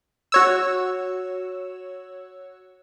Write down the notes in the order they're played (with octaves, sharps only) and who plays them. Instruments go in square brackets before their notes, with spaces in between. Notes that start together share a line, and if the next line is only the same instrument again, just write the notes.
[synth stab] F#4 C#5 E6